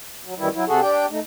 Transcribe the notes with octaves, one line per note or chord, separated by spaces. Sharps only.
F#3
F#2 D#3 E3 G3 E4
F#3 E4
C3 F#4 G#4 A4
D4 G4 G5
A3 D#4